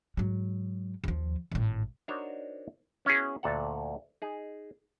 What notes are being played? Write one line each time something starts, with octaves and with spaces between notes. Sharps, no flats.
G#2 F#3
D#2 F3
G#1 A2
D4 D#4 F#4 A#4 C5 C#5
B3 C#4 E4 F#4 G#4
D2 A#2 A4 F#5
D#4 G#4